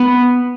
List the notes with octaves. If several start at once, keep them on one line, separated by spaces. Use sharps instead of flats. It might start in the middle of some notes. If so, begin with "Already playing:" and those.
Already playing: B3